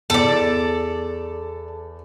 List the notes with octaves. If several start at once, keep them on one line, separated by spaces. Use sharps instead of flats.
E2 A4 D5